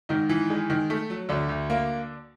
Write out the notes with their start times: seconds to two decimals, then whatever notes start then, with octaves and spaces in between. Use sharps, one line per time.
0.09 G#2 D#3 D#4
0.29 E3
0.50 G#3
0.70 D#3
0.90 A3
1.10 F#3
1.29 D2 D3 D4
1.49 D2
1.70 A#3